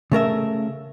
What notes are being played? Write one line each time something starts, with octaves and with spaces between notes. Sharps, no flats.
C#3 A3 A#4 E5